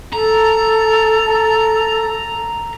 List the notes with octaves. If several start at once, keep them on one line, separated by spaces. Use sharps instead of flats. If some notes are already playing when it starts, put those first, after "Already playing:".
A4 A#5